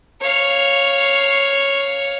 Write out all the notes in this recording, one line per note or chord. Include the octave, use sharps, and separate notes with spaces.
C#5 F5